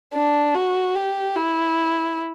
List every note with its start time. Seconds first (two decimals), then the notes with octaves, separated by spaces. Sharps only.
0.14 D4
0.55 F#4
0.95 G4
1.35 E4